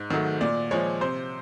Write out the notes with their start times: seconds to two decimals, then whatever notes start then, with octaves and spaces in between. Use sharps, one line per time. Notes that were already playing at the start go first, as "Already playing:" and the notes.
Already playing: G#2
0.10 D#3 F#3 A3
0.41 A#2 D5
0.71 F3 G#3 C#5
1.01 C3 C5